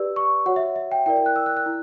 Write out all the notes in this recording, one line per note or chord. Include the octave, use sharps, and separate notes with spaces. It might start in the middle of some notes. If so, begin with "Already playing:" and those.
Already playing: G4 B4 D5 E6
C#6
F#4 C#5 F#5
E5
E5
G5
E4 A#4 D5 G5
G5
F#6
E6
F#6
F#6
E4